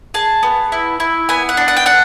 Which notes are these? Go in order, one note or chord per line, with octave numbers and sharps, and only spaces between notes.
G#4 A5
B3
E4
E4
B3 G#5
F#5
D4
F#5
G5
D4 F#5